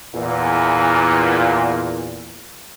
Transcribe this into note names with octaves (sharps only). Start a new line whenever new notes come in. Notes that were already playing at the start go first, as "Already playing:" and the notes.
E2 A#2